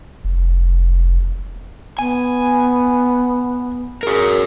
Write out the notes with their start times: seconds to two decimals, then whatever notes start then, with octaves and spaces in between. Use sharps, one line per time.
0.24 F1
1.99 B3 G#5
4.03 F#4 G#4 A#4